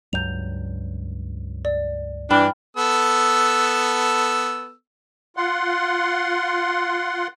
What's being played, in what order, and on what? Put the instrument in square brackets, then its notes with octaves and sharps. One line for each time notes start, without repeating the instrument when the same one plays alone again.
[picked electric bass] C#2 G2 F#3 [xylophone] G6 F7
[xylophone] D5
[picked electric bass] G2 [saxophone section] E3 D4 [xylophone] G5 B5 F6
[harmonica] B3 A4 E6
[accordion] F4 F#5 C6